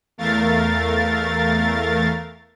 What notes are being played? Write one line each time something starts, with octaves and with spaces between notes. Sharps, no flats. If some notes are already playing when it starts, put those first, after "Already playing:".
E2 A3 A#4 F5 A6